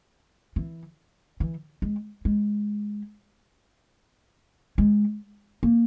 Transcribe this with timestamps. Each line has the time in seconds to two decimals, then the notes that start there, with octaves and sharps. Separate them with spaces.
0.56 E3
1.40 E3
1.82 G#3
2.25 G#3
4.78 G#3
5.63 A#3